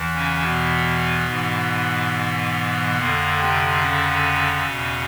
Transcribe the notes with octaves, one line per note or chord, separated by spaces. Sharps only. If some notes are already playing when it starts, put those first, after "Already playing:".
Already playing: E2 E3
C#3 C#4
B2 B3
G#2 E3
F2 D3 A#3
C3 C4
C#3 C#4
E2 B2